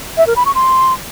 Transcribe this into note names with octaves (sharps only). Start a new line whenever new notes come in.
E5
A#4
B5
C#6
C6